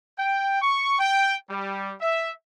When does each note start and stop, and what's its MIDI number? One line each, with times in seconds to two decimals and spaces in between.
0.19 0.60 79
0.62 0.95 85
0.99 1.36 79
1.50 1.94 55
2.01 2.31 76